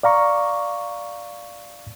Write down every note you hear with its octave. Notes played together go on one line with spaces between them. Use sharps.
D5 F5 A#5 C#6